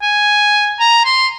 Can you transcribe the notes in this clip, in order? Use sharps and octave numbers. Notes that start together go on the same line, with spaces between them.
G#5
A#5
C6